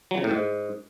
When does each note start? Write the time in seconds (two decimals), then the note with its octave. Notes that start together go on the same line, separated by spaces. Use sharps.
0.11 F#3
0.18 C#3
0.24 A2
0.31 G#2